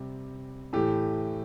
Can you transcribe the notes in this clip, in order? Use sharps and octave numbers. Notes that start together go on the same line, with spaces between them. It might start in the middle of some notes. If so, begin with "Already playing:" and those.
Already playing: C3 G3
A2 E3 A3 G4